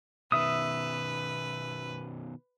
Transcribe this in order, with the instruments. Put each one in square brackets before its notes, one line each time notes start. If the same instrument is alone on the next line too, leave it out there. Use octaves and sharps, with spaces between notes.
[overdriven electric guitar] B2 D#3 [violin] B4 [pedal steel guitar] E5 D#6